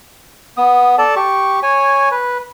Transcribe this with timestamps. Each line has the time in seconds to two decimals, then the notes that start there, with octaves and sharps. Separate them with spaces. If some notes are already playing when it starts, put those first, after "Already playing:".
0.57 B3 D#6
0.98 A4 D5 A5
1.16 G4 C#6
1.63 C#5 G#5
2.11 B4